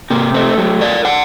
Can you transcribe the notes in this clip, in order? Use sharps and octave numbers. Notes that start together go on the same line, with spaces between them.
C3 A#3
A3 C4
F#3 A3
A#4 D5
D5 F#5